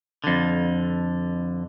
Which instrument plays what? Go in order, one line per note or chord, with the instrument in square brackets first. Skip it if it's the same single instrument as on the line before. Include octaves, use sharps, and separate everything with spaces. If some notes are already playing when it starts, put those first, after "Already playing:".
[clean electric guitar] F2 D3